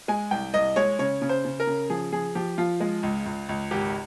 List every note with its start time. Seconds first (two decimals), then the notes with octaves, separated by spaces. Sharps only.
0.08 G#3 G#5
0.31 C2 G5
0.54 C2 D#5
0.76 G#3 C#5
0.99 C#3 C#5
1.22 C#3
1.29 C5
1.45 C#3
1.60 A#4
1.67 C#3
1.90 F3 G#4
2.12 F3 G#4
2.35 F3 G4
2.58 F3 F4
2.80 G#3
3.03 C#2
3.26 C#2
3.49 C#2
3.71 G#1 G4